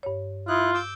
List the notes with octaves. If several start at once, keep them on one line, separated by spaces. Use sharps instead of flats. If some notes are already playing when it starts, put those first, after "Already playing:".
G2 C#5
E4 F4 D#6 F#6
D6 E6 G6